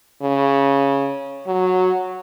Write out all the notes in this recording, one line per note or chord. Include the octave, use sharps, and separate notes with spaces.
C#3
F#3